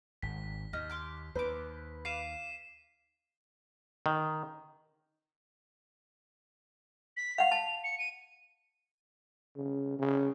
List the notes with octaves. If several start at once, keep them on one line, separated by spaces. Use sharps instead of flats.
G#1 B6
D#2 D#5 F6
C6 D6 F6
D#2 B4 C5 D6
F5 D6 C7 D#7 E7
D#3
B6
F5 F#5 F7
A5
C#7
D#7
C#3
C#3